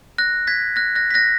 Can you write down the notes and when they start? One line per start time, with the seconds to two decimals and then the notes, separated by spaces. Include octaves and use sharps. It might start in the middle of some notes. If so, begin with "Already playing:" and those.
0.18 F#6 A#6
0.47 G#6 B6
0.76 F#6 A#6
0.95 F#6 A#6
1.11 B6
1.14 F#6 A#6